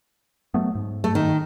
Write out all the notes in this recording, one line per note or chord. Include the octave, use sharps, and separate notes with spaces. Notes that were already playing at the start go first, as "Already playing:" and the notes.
F#3 A3 B3
G#2
A3
D#3